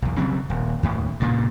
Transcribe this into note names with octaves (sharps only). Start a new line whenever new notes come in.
B1 E2
C#3 F#3 G3 C4
D#1
D#2 A2
G2 A#2 C#3